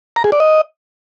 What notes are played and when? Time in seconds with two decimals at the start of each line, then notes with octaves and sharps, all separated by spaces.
0.16 A#5
0.24 G#4
0.32 D5
0.40 D#5